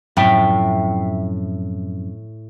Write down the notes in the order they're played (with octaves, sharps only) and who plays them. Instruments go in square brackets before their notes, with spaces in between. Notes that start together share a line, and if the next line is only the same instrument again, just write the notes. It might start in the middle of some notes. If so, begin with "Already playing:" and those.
[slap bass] F#2 C3 F3 [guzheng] A2 [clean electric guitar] E5 G5